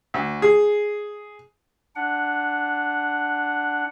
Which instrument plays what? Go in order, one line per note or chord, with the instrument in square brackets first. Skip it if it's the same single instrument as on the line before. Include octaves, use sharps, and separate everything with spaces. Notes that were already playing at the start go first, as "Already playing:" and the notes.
[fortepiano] D2
G#4
[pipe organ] D4 F#5